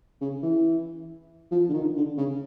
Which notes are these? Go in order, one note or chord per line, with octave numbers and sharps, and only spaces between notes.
C#3
E3
F3
D3
D#3
D3
C#3